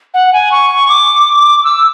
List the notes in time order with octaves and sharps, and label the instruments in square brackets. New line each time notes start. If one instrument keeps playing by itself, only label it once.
[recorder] F#5
G#5
C#6
D6
E6